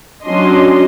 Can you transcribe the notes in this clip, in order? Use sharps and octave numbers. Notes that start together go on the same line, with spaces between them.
F#3 C#4 D4 D#5 C6